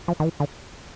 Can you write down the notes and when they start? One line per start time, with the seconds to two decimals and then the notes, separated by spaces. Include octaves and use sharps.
0.08 F3
0.20 D#3
0.24 E3
0.40 D3